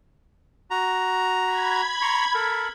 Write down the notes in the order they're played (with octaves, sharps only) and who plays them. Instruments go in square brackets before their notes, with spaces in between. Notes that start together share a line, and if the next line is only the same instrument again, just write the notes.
[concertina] F#4 A#5
[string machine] B5 G#6
[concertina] A#5 C6 C#6
A4 A#4